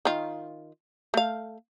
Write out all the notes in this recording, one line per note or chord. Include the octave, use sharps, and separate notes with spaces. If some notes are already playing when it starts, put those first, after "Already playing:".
D#3 F4
A3 F5